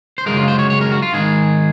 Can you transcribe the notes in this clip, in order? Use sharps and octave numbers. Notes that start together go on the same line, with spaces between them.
C5
F#2 C#3 G#3 A#4
F4
C5
C#5
C#5
A#4
F#4
F4
G#2 D#3 G#3 G#4